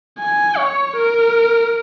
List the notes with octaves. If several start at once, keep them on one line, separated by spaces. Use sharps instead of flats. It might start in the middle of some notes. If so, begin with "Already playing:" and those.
G#5
C#5
A#4